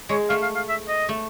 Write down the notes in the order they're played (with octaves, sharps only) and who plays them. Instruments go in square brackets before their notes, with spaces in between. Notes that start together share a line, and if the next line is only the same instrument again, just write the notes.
[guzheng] G#3 [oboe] C#5
[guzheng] A3 [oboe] F5
[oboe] F5
F5
E5
D#5
[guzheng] A3